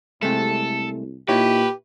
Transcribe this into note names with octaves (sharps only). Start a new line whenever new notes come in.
C2 C3 G#3 A3 A4
A#2 D#4 E4 G4 B4 C#5